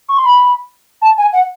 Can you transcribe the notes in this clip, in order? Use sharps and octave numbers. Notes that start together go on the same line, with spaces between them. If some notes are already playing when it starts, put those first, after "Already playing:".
C#6
C6
B5
A5
G#5
F#5